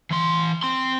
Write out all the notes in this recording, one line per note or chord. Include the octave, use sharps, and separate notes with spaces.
E3 C6
C4 C6